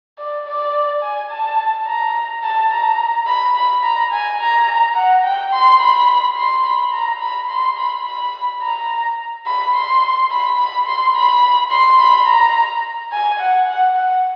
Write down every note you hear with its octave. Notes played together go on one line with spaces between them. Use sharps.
D5
D5
G#5
A5
A#5
A5
A#5
B5
B5
A#5
G#5
A#5
F#5
G5
C6
B5
C6
B5
A#5
B5
C6
B5
B5
A#5
B5
C6
B5
B5
C6
B5
C6
B5
A#5
G#5
F#5
F#5
F#5